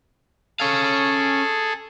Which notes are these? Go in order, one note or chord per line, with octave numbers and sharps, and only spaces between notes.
C#4 G#4 A4 F5